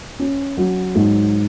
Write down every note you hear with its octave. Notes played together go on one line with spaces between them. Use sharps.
C#4
F#3
G#2